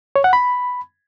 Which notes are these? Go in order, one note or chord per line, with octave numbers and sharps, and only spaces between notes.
C#5
F#5
B5